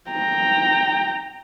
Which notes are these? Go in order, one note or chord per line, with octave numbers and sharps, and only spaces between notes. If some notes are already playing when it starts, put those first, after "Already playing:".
G5 A#5